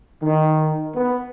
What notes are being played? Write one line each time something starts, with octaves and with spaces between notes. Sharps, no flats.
D#3
B3